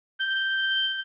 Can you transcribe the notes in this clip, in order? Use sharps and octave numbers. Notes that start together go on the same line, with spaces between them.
G6